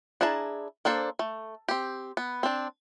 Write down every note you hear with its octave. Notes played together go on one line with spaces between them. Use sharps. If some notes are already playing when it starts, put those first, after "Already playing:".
D4 E4 G#4 A5 A#5
A#3 D4 A4 C5
A3
C4 G4
B3
C4 D4